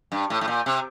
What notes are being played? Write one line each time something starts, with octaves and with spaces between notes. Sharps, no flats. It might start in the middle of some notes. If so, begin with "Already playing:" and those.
G2
A2
A2
A#2
C3